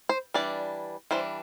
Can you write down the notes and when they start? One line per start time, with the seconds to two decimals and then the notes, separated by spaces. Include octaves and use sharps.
0.09 C5
0.34 E3 G3 D4 D5
1.11 E3 G3 D4 C5